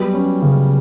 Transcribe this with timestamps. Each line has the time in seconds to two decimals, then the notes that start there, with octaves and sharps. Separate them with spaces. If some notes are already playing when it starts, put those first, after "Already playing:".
Already playing: F#3 G3 B3
0.14 C#4
0.42 C#3